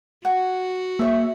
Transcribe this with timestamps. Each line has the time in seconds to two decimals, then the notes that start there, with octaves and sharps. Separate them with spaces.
0.25 F#4 F#5 G#5
0.99 A#3 G#4 C#5 E5 C#6